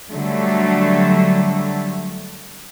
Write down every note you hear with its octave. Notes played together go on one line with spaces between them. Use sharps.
D3 F#3 G3 A3